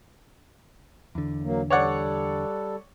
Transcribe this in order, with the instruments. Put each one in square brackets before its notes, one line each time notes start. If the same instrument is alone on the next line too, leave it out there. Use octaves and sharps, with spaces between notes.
[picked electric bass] E2 D3
[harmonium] F#3 A#3
[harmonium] G3 A4 [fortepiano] C#5 D5 F#5